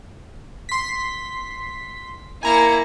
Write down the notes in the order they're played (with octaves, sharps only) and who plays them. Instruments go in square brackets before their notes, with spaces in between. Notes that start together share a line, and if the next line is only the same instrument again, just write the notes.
[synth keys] C6 B6
[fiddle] A#3 E4 [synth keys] G#5 A#5 C#7